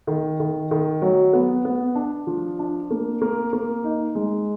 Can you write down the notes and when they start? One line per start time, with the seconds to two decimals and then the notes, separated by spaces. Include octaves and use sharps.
0.07 D#3
0.40 D#3
0.71 D#3
1.02 F#3
1.33 B3
1.65 B3
1.95 D4
2.27 F3
2.59 D4
2.91 A#3
3.22 A#3
3.53 A#3
3.84 D#4
4.15 G#3